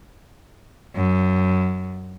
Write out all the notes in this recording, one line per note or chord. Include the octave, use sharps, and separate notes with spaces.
F#2